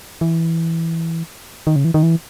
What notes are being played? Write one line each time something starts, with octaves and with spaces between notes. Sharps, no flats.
E3
D#3
C#3
E3
D#3
E3